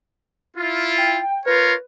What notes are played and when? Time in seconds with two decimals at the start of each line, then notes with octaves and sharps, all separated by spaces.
0.57 E4 F4
0.98 G5
1.46 F4 A#4 B4 C#5